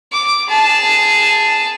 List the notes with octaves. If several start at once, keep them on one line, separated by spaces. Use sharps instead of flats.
D6
G#4 A5